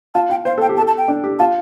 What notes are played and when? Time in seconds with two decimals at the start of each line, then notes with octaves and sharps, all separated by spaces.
0.15 F4 A5
0.30 F4 G5
0.45 C5 F5
0.58 A4 G5
0.69 G4
0.77 A5
0.81 A4
0.87 A5
0.98 G5
1.08 D4
1.24 G4
1.39 F4 A5